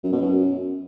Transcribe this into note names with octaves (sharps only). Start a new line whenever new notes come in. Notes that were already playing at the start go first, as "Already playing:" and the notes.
F#2
B2
F#2